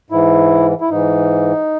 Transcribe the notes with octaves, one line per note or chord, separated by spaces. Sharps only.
G#2 E3 E4
E4
G#2 E3 D#4